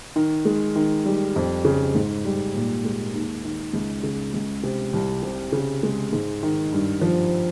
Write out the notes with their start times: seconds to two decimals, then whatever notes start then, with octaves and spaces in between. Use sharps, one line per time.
0.16 D#3
0.45 G#3
0.75 D#3
1.05 G3
1.36 F2
1.65 C#3
1.95 G#2
2.25 G3
2.54 A#2
2.85 G#3
3.14 D#2
3.44 D#3
3.73 C#2
4.03 C#3
4.34 C#2
4.63 C3
4.93 C2
5.23 C3
5.52 C#3
5.83 G#3
6.12 G#2
6.43 D#3
6.73 G2
7.01 F3